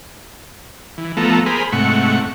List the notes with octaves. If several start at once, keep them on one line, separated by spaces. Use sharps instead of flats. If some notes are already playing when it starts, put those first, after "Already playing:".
E3
F3 A3 B3 A4 A#5
G#4 A#4 C5 B5
G#2 C3 A3 F#5 C#6